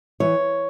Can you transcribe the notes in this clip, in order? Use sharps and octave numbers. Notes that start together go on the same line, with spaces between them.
E3 C#5